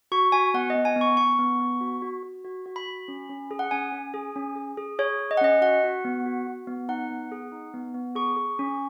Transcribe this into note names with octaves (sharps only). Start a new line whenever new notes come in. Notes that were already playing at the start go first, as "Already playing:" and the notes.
F#4 C#6
F#4 G#5
B3 F#5
D#5
B3
G#5
B3
C#6
B3 C#6
B3
B3
F#4
F#4
F#4
F#4
F#4
B5
F#4
C#4
C#4
G#4
F#5
C#4 G#5
C#4
G#4
C#4
G#4
G#4
G#4 C#5
G#4
D#5
F#5
C#4 D#5
F#4 F#5
F#4
B3
F#4
F#4
B3
D#4 F#5
B3
G#4
D#4
B3
B3
G#4 C#6
G#4
C#4